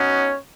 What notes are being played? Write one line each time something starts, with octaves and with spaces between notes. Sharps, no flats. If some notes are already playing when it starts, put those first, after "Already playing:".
Already playing: B3 C#4 D#4 F#4 C#5